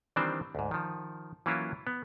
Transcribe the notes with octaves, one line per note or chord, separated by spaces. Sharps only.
D#3 E3 G3 C4 D4 C5
D2 G#2
D#3 F3
E3 F#3 A#3 C#4 E4 F4
B3